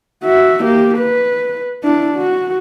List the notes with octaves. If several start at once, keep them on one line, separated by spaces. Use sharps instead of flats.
F#4 E5
A#3 G4
B4
D4 E4
F#4